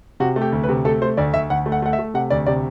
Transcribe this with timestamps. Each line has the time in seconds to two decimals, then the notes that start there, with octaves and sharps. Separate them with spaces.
0.20 C3 F#4
0.36 A3
0.42 G4
0.52 D2
0.63 B4
0.69 C3
0.85 A3 A4
1.02 A3 C5
1.17 D2 D5
1.34 D2 E5
1.50 D2 F#5
1.66 A3
1.72 F#5
1.82 A3 F#5
1.93 E5
1.99 A3
2.14 C3 F#5
2.30 D2 D5
2.46 C3 D5